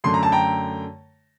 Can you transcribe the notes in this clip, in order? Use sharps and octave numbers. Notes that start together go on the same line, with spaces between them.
F#2 D3 A3 C6
A#5
A5
G5 A#5